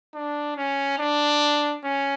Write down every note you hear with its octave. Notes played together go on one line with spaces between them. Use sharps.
D4
C#4
D4
C#4